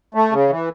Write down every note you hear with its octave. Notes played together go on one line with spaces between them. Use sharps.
A3
C#3
E3